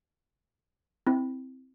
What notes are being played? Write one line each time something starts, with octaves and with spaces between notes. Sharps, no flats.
C4 E4